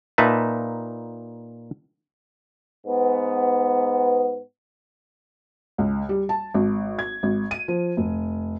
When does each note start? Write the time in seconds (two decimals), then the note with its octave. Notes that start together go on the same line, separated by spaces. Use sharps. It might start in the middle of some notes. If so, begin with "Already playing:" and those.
0.18 A#2 D#4 B4 E5 A5
2.87 G#2 B3
5.78 C#2
6.09 G3
6.29 A5
6.54 G#1
6.99 G#6
7.23 G#1
7.51 D#7
7.68 F3
7.97 F1